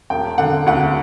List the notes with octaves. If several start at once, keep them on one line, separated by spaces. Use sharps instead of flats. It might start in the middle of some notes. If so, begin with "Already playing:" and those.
E1 G5
D3 F#5
D2 F#5